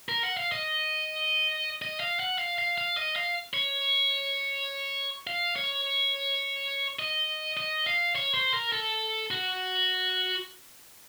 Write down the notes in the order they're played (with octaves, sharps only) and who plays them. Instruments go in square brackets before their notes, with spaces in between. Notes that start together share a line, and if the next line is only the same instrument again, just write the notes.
[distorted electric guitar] A#4
F#5
F5
D#5
D#5
F5
F#5
F5
F5
F5
D#5
F5
C#5
F5
C#5
D#5
D#5
F5
C#5
C5
A#4
A4
F#4